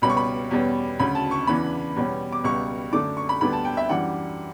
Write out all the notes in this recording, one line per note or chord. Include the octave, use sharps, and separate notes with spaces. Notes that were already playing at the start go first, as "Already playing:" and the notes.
C#2 B2 G3 C#4 B5
C#6
B5
E2 B2 G3 C#4
D2 C#3 F#3 B5
A5
C#6
E2 C#3 E3 B3 D4 B5
E2 B2 G3 C#4
D6
C#2 B2 G3 C#6
F#2 D3 A3 D4 D6
C#6
B5
D2 D3 G3 B3 D4 B5
A5
G5
E5
F#2 E3 G3 D4 F#5